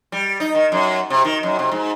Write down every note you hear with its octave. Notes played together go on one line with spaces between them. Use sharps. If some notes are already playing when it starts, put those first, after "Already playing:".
G3
D#4
D#3
F#2
C3
D#3
F#2
C3
G#2